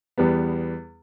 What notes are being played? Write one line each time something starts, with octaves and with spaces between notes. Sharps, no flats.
E2 G3 B3